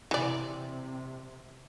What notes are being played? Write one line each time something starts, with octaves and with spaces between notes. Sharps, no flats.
C3 E3 D5